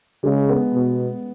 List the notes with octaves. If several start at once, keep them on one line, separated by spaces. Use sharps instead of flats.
C#3 G#3
B3
B2